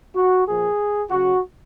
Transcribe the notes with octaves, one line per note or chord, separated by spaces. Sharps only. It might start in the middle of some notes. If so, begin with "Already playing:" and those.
F#4
A#2 F3 G#4
C#3 F#3 F#4